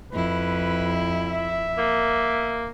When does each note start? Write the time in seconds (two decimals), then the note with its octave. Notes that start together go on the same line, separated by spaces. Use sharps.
0.13 F2 E4 B4
1.27 E5
1.78 A#3